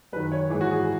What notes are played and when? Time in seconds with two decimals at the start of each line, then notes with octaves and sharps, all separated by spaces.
0.13 F#2 B4
0.16 D#3
0.32 C#5
0.50 G#2 E3 G#4
0.61 F#4
0.71 G#4